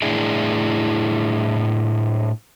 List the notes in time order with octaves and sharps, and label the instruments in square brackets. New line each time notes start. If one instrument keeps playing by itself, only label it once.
[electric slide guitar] A2 D4 E4 G#4 G5